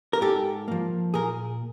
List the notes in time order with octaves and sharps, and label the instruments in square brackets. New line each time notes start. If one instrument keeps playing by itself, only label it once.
[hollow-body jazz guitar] A#4
G#2 G4 A4
F3 A#3
A#2 G#4 A#4